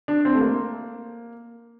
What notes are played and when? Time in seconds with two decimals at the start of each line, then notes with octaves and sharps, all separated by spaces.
0.08 D4
0.25 C4
0.35 A3
0.41 A#3